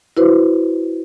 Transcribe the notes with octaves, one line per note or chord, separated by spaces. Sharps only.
E4 F#4 B4 C5